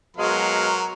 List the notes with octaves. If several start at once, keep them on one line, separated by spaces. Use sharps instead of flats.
B2 F#3 G#3 A#4 F5 C6